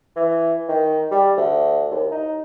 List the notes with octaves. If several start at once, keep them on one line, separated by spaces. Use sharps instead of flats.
E3
D#3
G3
D2
D#2
D#4